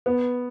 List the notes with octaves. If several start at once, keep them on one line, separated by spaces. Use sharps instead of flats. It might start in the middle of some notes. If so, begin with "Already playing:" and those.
B3